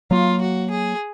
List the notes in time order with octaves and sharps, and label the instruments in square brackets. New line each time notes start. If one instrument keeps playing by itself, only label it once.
[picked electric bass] F#3 A#3 [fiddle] F4
[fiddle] F#4
G#4